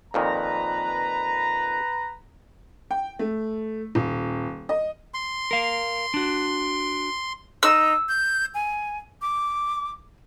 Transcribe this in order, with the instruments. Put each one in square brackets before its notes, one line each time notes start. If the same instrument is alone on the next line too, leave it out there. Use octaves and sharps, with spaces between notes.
[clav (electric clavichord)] F2 A#2 D#3 [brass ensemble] B4 A#5
[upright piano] G5
A3
D#1
D#5
[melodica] C6
[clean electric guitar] A#4 F5
D4 F#4
[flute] D#4 [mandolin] E6
[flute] G6
G#5
D6